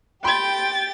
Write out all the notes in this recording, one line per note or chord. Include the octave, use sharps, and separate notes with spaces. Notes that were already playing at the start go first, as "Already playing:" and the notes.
G4 G5 B5 C6 A6